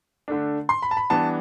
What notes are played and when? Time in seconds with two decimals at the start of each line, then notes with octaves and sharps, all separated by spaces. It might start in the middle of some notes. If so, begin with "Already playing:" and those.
0.28 D3 A3 D4
0.69 C6
0.82 B5
0.91 A5
0.97 B5
1.10 E3 G3 B3 D4 A5